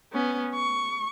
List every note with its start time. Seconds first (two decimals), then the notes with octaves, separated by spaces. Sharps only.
0.13 B3 C#4
0.55 C#6